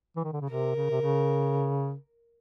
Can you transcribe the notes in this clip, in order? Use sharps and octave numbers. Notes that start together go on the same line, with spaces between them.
E3
D#3
D3
C#3
C3 A#4
C#3
C3
C#3